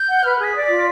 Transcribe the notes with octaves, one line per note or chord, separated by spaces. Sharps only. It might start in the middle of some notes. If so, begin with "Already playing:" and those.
Already playing: G6
F#5
B4 F6
G#4 F#6
B6
D5
F4